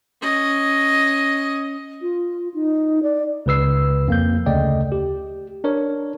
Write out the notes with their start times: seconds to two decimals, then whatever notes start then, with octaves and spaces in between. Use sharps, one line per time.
0.22 C#4 D#5
2.01 F4
2.54 D#4
3.03 D5
3.46 C#2 C#3 B4 E6 C7
4.08 F2 A#3 G6
4.46 D2 C#3 A3 D5 D#5 G5
4.92 G4
5.64 D4 A#4 C#5